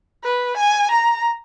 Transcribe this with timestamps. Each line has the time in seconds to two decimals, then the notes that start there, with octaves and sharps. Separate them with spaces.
0.24 B4
0.57 G#5
0.91 A#5